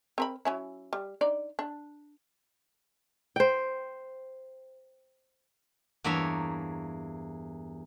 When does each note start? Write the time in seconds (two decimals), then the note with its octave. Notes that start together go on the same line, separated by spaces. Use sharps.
0.18 C4 A#4 B5
0.45 F#3 C#4 E4
0.93 G3
1.21 D4 D#4 D5
1.59 D4
3.36 C5 G5
6.04 E2 G2 A#3 C#5 E5 A#5